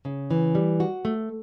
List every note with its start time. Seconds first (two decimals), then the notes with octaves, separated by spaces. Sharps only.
0.05 C#3
0.31 E3
0.55 G3
0.80 F#4
1.05 A3